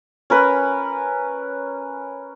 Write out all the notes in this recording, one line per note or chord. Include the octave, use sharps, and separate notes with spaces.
C#4 A#4 B4